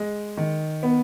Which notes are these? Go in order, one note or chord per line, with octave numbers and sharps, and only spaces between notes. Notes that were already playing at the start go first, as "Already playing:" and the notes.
Already playing: G#3
D#3
B3